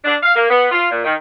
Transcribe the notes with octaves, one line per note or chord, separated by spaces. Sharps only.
D4
F5
A#3
B3
F4
A#2
D#3